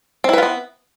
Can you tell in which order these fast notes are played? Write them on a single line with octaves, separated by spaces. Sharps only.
C4 E4 B4 F4 B3